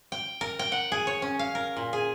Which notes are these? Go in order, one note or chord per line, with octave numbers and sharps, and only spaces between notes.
G5
A#4
G5
F#5
G#4
C#5
C#4
F5
A#4
A#2
G#4